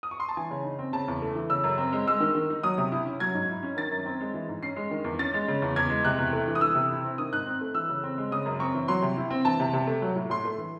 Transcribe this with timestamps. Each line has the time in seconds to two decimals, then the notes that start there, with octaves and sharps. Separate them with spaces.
0.03 D#6
0.11 C#6
0.20 C6
0.29 A5
0.37 E3 G#5
0.51 C#3
0.64 D#4
0.79 C4
0.93 C#3 A5
1.08 E2
1.22 A3
1.36 E3
1.50 C#3 E6
1.64 F#2
1.78 C4
1.93 G#3
2.07 G#3 E6
2.20 D#3
2.35 D#3
2.50 D#4
2.63 F#3 D#6
2.78 C3
2.92 E4
3.06 C#4
3.20 F#3 G#6
3.34 G#2
3.49 E4
3.63 C#4
3.77 D#3 A6
3.91 F#2
4.06 C4
4.20 G#3
4.34 E3
4.49 G#2
4.63 C#4 C7
4.77 G#3
4.91 D#3
5.04 E2
5.19 C#4 A6
5.34 G#3
5.48 C#3
5.62 E2
5.76 E2 G#6
5.90 G#3
6.05 C3 F#6
6.19 E2
6.33 A3
6.48 E3
6.55 D#6
6.61 E3 E6
6.75 C3
6.90 E4
7.04 C4
7.18 D#3 D#6
7.33 G#2 F#6
7.46 C4
7.61 A3
7.74 E3 E6
7.89 C#3
8.03 C4
8.18 G#3
8.31 C#3 D#6
8.46 F#2
8.59 C4 C#6
8.74 E3
8.88 F#3 C6
9.02 C3
9.17 E4
9.30 C4
9.45 E3 A5
9.60 C3
9.73 C3
9.87 A3
10.02 F#3
10.16 A2
10.30 A2 C6
10.45 A3
10.58 E3